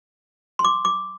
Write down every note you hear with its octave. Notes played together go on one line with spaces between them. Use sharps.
C6
D6
D6